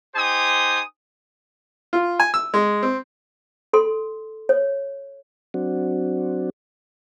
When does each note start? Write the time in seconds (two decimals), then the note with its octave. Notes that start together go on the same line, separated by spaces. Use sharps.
0.15 D#4 G4 C5 G#5 D#6
1.93 F4
2.20 G#5
2.34 E6
2.54 G#3
2.83 C4
3.73 A4 C6
4.49 C#5
5.54 F#3 C4 D4 F#4